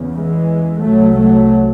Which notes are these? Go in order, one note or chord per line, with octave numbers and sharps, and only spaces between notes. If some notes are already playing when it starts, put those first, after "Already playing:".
Already playing: E2 C#3
E3 G#3
C2 C3 F#3 A3
F#3 A3